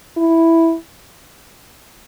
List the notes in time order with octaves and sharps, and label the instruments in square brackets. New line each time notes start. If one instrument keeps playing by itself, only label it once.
[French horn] E4